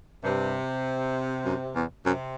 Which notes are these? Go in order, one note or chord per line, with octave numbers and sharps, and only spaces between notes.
G2 C3
F#2
E2
F#2 C3